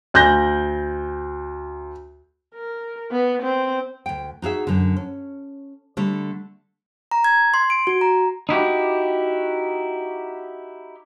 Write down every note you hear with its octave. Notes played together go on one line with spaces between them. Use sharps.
D2 F#6 G6 A#6
A#4
B3
C4
D2 G5
D#4 F#4 G#4 E5
F#2 D3
C#4
D3 G3 A3
A#5
G#6
C6
D7
F#4
A#5
D#4 E4 F#4 G4